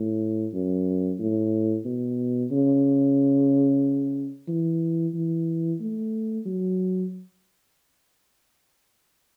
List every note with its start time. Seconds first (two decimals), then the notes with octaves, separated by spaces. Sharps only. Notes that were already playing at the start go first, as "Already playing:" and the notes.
Already playing: A2
0.54 F#2
1.19 A2
1.85 B2
2.51 C#3
4.48 E3
5.14 E3
5.80 A3
6.46 F#3